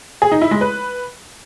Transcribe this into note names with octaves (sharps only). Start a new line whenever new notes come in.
G#4
D#4
E4
G#3
B4